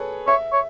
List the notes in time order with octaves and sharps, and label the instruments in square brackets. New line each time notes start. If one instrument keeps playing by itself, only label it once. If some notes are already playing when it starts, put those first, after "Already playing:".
Already playing: [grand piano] G#4 A4 B4 C#5
[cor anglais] C#5 [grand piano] E5
[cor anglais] C#5